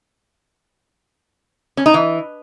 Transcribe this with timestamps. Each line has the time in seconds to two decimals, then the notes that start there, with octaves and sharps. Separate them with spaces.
1.77 C#4
1.86 D#4
1.94 E3